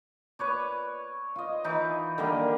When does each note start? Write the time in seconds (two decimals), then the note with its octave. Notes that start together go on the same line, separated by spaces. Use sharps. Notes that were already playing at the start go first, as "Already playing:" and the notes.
0.39 B4 C#5 D5
1.36 F4 D#5
1.64 E3 D#4
2.18 D3 D#3 G3 A#3